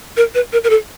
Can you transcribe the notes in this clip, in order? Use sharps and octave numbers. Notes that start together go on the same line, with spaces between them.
A#4
B4
A#4
A#4
A4